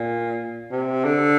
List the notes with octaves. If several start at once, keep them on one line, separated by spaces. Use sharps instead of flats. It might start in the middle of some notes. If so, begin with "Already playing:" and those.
Already playing: A#2
C3
D3